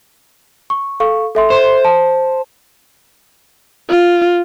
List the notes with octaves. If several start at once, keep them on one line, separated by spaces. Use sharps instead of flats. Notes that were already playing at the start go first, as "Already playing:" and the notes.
C#6
A4 F5 C#6
A4 E5 C6
C5
A5
F4